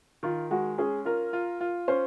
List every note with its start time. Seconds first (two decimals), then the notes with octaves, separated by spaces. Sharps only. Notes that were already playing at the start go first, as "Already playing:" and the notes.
0.23 D#3 F4
0.51 G#3 F#4
0.78 C#4 G#4
1.05 F4 A#4
1.33 F4
1.61 F4
1.88 C#4 C5